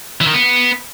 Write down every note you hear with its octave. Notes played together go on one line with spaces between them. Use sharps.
E3
D#3
B3